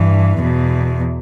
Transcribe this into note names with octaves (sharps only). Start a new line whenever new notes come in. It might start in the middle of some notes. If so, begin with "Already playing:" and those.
Already playing: G2 E3
E2 B2